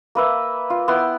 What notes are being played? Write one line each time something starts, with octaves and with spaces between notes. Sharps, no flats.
A#3 B4 E5
F4
B3 E4 G5 C6